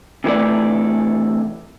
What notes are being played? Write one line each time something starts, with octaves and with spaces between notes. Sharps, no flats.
C3 E3 A3 D5